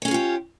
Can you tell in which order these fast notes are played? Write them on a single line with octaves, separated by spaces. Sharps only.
C#5 C#4 G#4 F4 G4